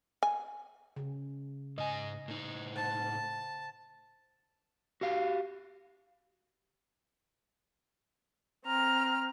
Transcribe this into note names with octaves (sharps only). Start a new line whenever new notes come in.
G#5
C#3
G#2 D#5 G#5
A2 D#4
C5 F#5 A5
F#4 G4 F5
C4 A#5 F6